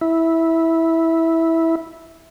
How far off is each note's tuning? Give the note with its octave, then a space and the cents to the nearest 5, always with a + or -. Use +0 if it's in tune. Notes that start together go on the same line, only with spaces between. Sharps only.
E4 -10